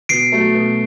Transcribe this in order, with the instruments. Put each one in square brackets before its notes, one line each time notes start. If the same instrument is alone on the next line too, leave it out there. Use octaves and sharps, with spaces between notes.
[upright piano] B2 [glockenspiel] C7 D7
[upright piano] F#3 A3
B2